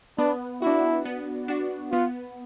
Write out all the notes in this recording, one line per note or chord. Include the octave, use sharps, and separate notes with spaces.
B3 D4
D4 E4 F#4
B3
D4 F#4
B3 F4